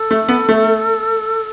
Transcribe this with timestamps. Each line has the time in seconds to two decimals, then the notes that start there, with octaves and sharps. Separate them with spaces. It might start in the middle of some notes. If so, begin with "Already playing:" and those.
Already playing: A4
0.11 A3
0.28 B3
0.49 A3